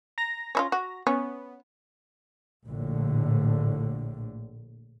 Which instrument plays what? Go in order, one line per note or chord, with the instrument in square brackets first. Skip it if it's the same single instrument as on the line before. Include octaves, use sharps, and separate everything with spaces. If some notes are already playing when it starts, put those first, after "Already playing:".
[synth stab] A#5 A#6
[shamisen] C#4 E4 F4
F#4
[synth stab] B3 [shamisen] C#4
[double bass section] A#1 A2 D3